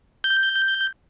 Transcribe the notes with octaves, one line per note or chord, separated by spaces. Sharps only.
G6